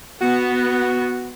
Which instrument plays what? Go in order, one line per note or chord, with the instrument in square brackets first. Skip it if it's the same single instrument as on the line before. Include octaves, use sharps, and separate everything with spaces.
[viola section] B3 [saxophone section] F#4